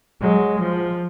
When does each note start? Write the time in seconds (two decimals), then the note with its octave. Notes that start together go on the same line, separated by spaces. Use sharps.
0.21 F#3 G#3
0.59 F3